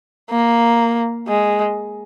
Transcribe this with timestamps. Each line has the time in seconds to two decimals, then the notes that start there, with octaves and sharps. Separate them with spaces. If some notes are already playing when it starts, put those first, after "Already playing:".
0.31 A#3
1.28 G#3